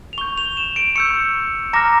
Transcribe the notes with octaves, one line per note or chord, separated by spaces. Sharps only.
F7
C#6 G6 G7
F7
E7
D7
C#6 E6 G6 C#7
A#5 D6 F6 A#6